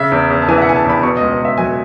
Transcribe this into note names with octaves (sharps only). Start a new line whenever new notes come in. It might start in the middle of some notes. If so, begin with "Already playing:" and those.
Already playing: C#3 E5
E2
E2
A5
E3 G#5
E5
F#5
C#3 G#5
A5
E2 B5
B2 C#6
C#2 D#5
D#5
C#2
E5
F#3 G#5